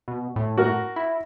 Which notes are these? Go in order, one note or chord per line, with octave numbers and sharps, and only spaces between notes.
B2
A2
F#4 A#4
E4